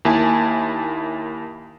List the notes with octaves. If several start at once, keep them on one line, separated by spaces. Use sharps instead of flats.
D#2 A#3 E4 G#5 A5